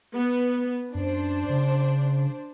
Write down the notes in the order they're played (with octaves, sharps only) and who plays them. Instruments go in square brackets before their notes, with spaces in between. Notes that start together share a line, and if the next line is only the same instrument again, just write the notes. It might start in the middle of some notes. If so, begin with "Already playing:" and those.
[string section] B3
[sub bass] F#2 [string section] D4 C5
[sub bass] C#3